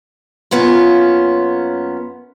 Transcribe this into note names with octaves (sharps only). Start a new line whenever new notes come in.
F#2 A#3 B3 C#4 F4